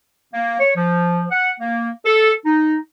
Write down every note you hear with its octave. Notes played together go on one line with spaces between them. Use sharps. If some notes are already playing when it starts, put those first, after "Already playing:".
A#3
C#5
F3
F#5
A#3
A4
D#4